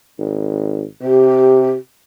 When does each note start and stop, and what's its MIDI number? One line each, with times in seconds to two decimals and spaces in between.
0.19 0.85 32
1.02 1.75 48
1.02 1.72 67